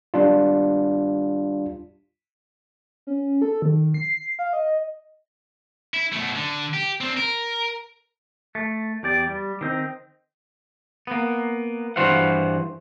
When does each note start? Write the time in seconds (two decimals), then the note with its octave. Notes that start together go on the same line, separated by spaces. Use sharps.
0.14 G3 D4 F4
3.07 C#4
3.42 A4
3.62 D#3
3.94 C7
4.39 F5
4.53 D#5
5.94 E4
6.12 B2 A3
6.35 D3
6.74 G4
7.01 C4 D4
7.17 A#4
8.55 A3
9.03 E2 G4 D5
9.28 G3
9.61 D#3 C4 D#4
11.07 A#3 B3
11.96 G2 E3 F#4 C5 F5 F#5